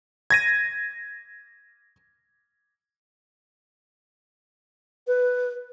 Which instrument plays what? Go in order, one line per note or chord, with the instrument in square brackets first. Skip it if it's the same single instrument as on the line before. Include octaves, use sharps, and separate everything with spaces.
[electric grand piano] G#6 A#6 D#7
[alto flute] B4